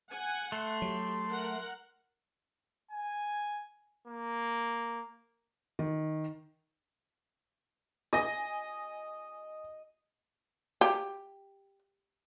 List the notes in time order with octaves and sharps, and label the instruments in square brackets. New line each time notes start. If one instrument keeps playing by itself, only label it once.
[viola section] F#5 [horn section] G#5
[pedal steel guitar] A3 [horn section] C6
[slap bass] F#3 [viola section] G4
[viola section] A#4 F#5
[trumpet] G#5
A#3
[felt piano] D#3
[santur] D#5 [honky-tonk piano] G#5 A#6
[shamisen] G4